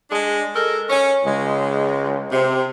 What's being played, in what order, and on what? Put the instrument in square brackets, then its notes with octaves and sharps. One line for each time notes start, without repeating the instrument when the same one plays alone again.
[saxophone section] G#3 D4
G#3 A4 A#4
C#4
[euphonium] C#2 [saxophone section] G#3
[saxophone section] C3 [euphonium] C4